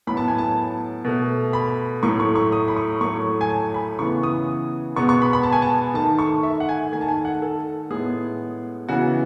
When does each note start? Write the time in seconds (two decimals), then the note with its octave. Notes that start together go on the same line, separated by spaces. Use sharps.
0.07 A2 F#3 B3 B5
0.17 A5
0.28 G#5
0.38 A5
1.04 B2 A3
1.53 B5
2.03 A2 F#3 A3 C#6
2.20 C#6
2.35 C#6
2.52 D#6
2.68 B5
2.76 C#6
3.01 A2 F#3 A3 C#6
3.41 G#5
3.50 A5
3.74 B5
3.99 C#3 E3 B3 C#6
4.23 D#6
4.96 B2 G#3 B3 C#6
5.09 C#6
5.22 B5
5.33 B5
5.43 A5
5.52 G#5
5.62 A5
5.94 D#3 A3 A5
6.19 C#6
6.43 E5
6.60 F#5
6.69 G#5
6.92 D#3 A3 G#5
7.01 A5
7.08 G#5
7.25 F#5
7.42 A4
7.90 A2 G#3 B3 G#4
8.89 C#3 E3 B3 F#4